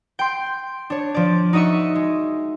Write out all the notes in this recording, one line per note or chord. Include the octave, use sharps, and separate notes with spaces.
G5 C6
D4 C#5
F3 D5
D#4 F#4 D#5 E5 C#6
G#3